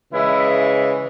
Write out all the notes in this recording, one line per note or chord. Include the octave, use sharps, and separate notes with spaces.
C#3 E3 G#3 E4